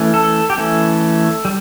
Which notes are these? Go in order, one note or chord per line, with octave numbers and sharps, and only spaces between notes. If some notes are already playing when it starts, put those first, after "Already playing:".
Already playing: E3 A3 C#4
A4
G4
E3 A3 C#4 A4
G3